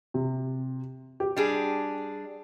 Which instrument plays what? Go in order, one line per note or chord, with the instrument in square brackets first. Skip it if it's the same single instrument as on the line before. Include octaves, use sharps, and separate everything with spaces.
[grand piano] C3
G4
[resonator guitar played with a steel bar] G3 D4 G#4